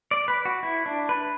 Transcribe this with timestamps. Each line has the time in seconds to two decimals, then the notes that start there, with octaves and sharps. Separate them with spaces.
0.11 D5
0.28 B4
0.45 F#4
0.63 E4
0.86 D4
1.09 B4